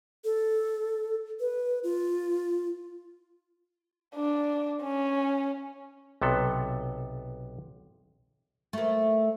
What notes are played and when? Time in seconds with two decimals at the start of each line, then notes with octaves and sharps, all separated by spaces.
0.24 A4
1.40 B4
1.83 F4
4.15 D4
4.83 C#4
6.21 B1 C3 B3 A4
8.73 A3 A#3